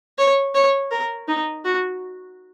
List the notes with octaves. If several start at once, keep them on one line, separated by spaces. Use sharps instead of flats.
C#5
C#5
A#4
D#4
F#4